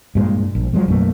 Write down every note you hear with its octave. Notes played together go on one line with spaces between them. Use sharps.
G2 A#2 G#3
A#1
F3 F#3 G#3 A3
B1 F#2 A3 A#3